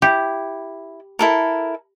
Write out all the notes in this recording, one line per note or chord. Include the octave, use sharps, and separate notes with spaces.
E4 G4
E4 A4 A#4